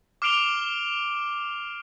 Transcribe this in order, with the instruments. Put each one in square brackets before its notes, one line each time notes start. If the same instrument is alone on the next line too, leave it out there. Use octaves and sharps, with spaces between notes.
[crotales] D6 F6 C7 D7 F7 G7